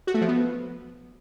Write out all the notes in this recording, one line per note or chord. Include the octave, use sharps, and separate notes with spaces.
F#4
A3
F3
B3